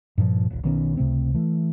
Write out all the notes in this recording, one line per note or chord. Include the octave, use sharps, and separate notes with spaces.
G2 A#2 D3 F3
D#1 A#1
B1 D#3 B3 C#4
C#2 C3 A3 C4
E3 A3